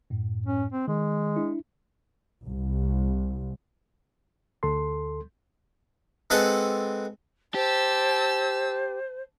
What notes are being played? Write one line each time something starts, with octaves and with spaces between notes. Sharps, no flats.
F#2 A2
C#4
C4
D#3 G#3
D4 E4
C2
D2 A4 C6
G#3 C4 A4 B4 F#5 G#5
G4 C5 A5 E6